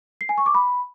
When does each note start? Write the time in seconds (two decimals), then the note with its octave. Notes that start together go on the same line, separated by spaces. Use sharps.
0.21 C7
0.29 G#5
0.38 C#6
0.46 D6
0.55 B5